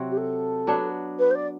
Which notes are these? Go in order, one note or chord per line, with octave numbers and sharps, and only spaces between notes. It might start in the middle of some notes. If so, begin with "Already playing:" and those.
Already playing: C3 F#3 C4 F#4
G4
A4
F#3 B3 D4
B4
C5
D5